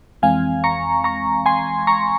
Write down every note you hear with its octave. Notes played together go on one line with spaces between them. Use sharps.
F2 E3 G#3 C4 F5 G#5
A#5 C#6
A#5 C#6
G#5 C6
A#5 C#6